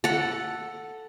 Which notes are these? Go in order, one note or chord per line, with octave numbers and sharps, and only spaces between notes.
A4 F#5